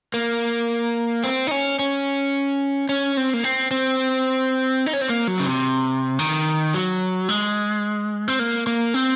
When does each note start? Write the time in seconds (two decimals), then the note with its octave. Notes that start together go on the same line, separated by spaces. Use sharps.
0.14 A#3
1.24 C4
1.47 D#4
1.51 C#4
1.79 C#4
2.89 C#4
3.17 C4
3.34 A#3
3.44 C4
3.71 C4
4.86 D#4
4.93 C#4
5.01 C4
5.10 A#3
5.28 F#3
5.39 C#3
5.46 C3
6.19 D#3
6.74 F#3
7.29 G#3
8.28 C4
8.39 A#3
8.67 A#3
8.94 C4